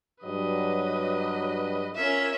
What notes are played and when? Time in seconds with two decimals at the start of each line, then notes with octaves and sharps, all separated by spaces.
0.24 G2 F#3 B4 D#5
1.96 C#4 F4 A#4 E5